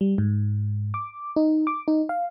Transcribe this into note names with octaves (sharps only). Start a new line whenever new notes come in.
G3
G#2
D6
D#4
D6
D#4
F5